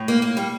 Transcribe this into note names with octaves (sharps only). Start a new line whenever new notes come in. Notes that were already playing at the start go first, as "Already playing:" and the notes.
Already playing: A2
A#3
A#3
G3